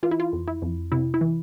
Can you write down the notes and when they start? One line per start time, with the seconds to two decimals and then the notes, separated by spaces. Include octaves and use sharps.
0.03 E3 F4
0.11 E4
0.20 F4
0.33 F2
0.48 E4
0.62 F2
0.92 C3 E4
1.14 E4
1.21 E3